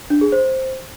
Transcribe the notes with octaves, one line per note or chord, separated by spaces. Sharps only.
D4
G#4
C5